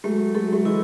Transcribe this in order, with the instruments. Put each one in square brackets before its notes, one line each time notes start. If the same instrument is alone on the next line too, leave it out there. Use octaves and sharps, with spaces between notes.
[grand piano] F#3 A3 [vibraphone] G#3
[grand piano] F#3 A3 [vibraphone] A4
[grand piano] A3
[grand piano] E3 G#3 [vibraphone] E4